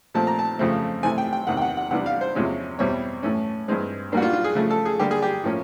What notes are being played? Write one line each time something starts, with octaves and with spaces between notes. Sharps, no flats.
A#2 F3 A3 C4 A5
A#5
A5
F2 C#3 F3 A3 C4
C3 E3 A3 C4 G#5
G5
G5
E2 C3 D#3 F#5
G5
F#5
F#5
C3 E3 G3 B3 D4 F#5
F5
C5
E2 C3 F3 G#3 C#4
E2 B2 G3 C4 C#5
A2 E3 A3 C#4
G2 E3 G#3 C4
A#2 G3 A#3 D4 F#4
F4
F4
G#4
C#3 F3 A3
A4
G#4
D3 G3 A#3 D4 G4
G#4
G4
A2 F3 A#3 C#4